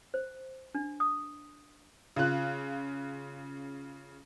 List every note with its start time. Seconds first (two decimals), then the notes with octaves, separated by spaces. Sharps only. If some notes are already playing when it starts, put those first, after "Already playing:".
0.14 C5
0.75 D4
1.00 D#6
2.16 C#3 F4 F#6